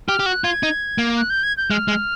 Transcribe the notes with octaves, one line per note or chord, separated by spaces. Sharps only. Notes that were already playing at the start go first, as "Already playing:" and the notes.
G4 F6
G4
F#4 F#6
F4 G#6
D#4
A#3
F#6
G6
G#6
G6
G#3 F6
G#3